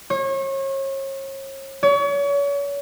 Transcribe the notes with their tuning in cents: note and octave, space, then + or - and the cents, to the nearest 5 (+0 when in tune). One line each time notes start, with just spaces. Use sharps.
C#5 -35
C#5 +35